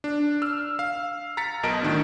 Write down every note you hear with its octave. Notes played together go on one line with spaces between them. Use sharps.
D4
E6 F6
F5
A#5 A6 B6 C#7
B1 B2 A#4 D#5 A5 D7
A2 D#3 D4